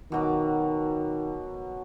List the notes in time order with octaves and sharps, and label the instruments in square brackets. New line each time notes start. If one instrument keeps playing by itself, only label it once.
[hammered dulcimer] B2 F#3 D6 [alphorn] D#3